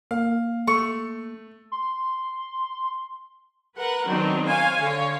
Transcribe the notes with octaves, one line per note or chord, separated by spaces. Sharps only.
A#3 F5
A3 C#6
C6
A#4 B4 F#5
D#3 F#3 B3 C4 D4 D#4
C5 C#5 F5 G#5
D3 C#5 F5